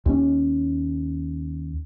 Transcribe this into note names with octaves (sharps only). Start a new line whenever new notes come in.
D#2 C#4